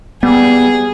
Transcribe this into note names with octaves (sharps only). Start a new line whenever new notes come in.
G3 B3 G#4